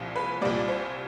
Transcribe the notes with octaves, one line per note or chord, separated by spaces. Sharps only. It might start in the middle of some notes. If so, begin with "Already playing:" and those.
Already playing: C2 A#2 F3
B4
C2 A#2 G3 D5
C5